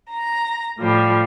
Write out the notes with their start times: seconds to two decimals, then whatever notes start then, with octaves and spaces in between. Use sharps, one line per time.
0.11 A#5
0.78 A2 F3 G3